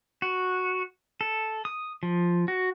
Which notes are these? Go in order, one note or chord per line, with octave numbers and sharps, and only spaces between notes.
F#4
A4
D#6
F3
F#4